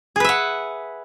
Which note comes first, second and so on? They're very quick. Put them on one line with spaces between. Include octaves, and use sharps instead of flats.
G#4 B4 E5 F#5